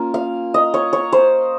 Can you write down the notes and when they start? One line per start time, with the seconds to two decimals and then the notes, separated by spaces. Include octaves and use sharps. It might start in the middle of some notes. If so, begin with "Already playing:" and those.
Already playing: A#3 C#4 F4
0.14 F5
0.54 D#5
0.74 C#5
0.93 C#5
1.13 C5